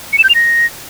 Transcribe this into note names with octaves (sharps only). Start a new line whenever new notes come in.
C#7
E7
G6
F7
A#6